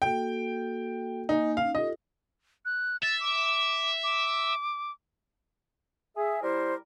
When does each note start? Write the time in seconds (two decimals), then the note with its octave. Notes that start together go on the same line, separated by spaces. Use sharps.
0.02 A#3 F#4 A4 G5
1.29 A#3 D#4 G#5
1.57 C#4 D#4 F5
1.75 F4 G4 A4 D#5
2.65 F#6
3.03 E5 A6
3.20 D6
4.04 D6
6.16 G#4 E5
6.42 G3 E4 A#4 C5